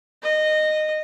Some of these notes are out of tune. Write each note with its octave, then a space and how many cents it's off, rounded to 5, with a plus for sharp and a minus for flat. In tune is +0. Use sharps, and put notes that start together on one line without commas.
D#5 -15